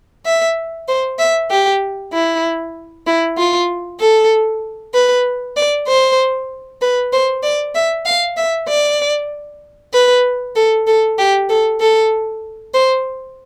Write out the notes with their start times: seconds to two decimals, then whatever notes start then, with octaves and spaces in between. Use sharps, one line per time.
0.26 E5
0.88 C5
1.19 E5
1.51 G4
2.13 E4
3.07 E4
3.38 F4
4.00 A4
4.94 B4
5.56 D5
5.88 C5
6.81 B4
7.12 C5
7.43 D5
7.75 E5
8.06 F5
8.37 E5
8.68 D5
9.93 B4
10.56 A4
10.87 A4
11.18 G4
11.49 A4
11.81 A4
12.74 C5